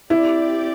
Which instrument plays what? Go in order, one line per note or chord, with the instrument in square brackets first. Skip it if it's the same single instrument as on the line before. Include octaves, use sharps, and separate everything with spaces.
[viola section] C4 G4 D5 [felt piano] E4